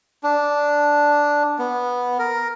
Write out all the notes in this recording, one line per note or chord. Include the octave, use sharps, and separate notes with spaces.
D4
B3
A#4